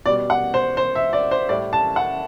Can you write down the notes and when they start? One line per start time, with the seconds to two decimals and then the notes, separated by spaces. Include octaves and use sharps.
0.05 B2 D5
0.09 G3
0.30 F#5
0.54 C5
0.77 C5
0.95 E5
1.13 D5
1.31 C5
1.49 A2 G3 D5
1.73 A5
1.96 F#5